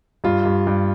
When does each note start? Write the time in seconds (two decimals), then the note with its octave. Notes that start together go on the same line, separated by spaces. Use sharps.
0.24 G2 F4
0.45 G2
0.67 G2